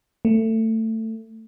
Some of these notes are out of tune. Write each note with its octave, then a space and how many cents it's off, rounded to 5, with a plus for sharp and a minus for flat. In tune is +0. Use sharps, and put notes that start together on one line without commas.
A3 +20